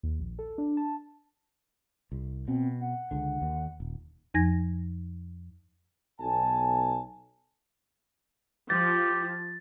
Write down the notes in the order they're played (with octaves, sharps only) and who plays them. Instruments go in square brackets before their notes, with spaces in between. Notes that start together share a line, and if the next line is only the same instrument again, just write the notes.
[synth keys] D#2
A#1
A4
D4
A5
[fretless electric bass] C2
[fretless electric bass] B2 [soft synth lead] C4
[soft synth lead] F#5
[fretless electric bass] C#2 D3
D#2
D#1
[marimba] F2 F3 D#4 G#5 G#6 A#6
[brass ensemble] B1 G#5 A5
[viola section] F3 [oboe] G4 [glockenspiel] A6